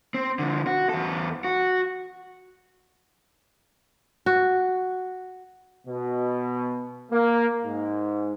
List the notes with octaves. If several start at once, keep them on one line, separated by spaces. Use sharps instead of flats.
C4
D3 F3
F#4
E2 A4
F#4
F#4
B2
A#3
G#2